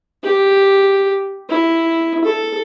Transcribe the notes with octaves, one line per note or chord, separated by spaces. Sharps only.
G4
E4
A4